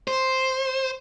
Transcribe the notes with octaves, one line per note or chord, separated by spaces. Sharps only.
C5